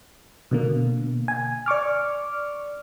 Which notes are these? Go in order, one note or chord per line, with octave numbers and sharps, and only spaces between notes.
B2 D3 A#3
G#5
D5 C#6 D6 F6